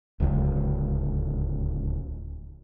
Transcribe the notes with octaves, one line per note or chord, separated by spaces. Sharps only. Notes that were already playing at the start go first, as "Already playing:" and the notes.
D1 C#2